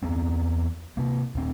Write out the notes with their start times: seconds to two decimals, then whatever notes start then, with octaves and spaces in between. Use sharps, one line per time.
0.03 E2 B3 C4
0.97 C3 A#3
1.35 D#1 C4